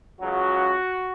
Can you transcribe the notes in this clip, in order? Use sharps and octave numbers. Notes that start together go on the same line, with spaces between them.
C#2 C#3 F#3 F#4